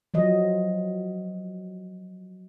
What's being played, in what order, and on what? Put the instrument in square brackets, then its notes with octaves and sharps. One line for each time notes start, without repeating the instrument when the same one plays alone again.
[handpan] F3 F#3 D#5